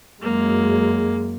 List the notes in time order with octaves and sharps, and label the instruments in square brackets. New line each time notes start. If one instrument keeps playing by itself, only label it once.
[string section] F#2 G#3 [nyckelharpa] A#3